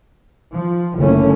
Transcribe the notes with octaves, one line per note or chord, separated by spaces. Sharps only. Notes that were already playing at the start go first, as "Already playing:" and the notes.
F3
F#1 D3 A3 C#4